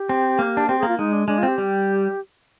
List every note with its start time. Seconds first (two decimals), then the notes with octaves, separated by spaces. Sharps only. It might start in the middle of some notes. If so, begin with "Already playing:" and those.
Already playing: G4
0.09 C4
0.39 A#3
0.57 D4
0.68 C4 G4
0.79 A#3 G#4
0.88 F4
0.98 G#3 D#4
1.13 D4
1.27 G#3 D4
1.38 C4 F4
1.48 G4
1.58 G3